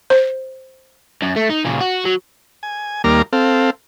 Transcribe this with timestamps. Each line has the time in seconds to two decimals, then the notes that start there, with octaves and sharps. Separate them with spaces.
0.10 C5
1.22 F#2
1.37 A3
1.50 D#4
1.65 A#2 C#3
1.81 F#4
2.05 F#3
2.63 G#5
3.04 D#2 G3 A#3 A#5 D6 F6
3.33 C4 A4 F5